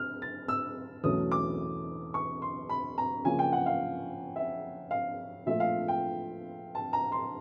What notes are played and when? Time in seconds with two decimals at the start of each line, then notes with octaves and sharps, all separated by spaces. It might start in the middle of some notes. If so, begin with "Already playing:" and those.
Already playing: F6
0.22 A6
0.48 E6
1.04 E2 B2 F#3 A3 C#4 D#6
1.32 D6
2.14 C#6
2.42 C6
2.69 B5
2.98 A#5
3.25 C#3 F3 A#3 C#4 G#5
3.39 G5
3.53 F#5
3.66 F5
4.36 E5
4.91 F5
5.46 A#2 F3 A3 E5
5.60 F5
5.88 G5
6.75 A5
6.93 A#5
7.12 C6